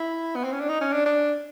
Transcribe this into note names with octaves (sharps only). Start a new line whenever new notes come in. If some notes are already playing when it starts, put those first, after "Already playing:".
Already playing: E4
B3
C4
C#4
D4
D#4
C#4
D4
D4